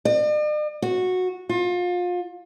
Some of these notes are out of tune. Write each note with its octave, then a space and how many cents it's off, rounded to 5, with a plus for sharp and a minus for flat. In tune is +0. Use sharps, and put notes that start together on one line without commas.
D5 +45
F#4 -15
F4 +30